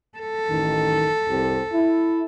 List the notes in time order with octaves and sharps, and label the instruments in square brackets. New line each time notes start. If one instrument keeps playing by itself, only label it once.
[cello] A4
[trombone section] A1 D#3
C2 C4 G4
E4